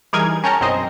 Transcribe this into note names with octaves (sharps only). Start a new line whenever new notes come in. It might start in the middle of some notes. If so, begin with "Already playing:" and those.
E3 G3 D#4 G#4 A#4 G#6
C#4 A#4 C#5 G5 A5 A#5
B1 F#2 C4 C5 D#5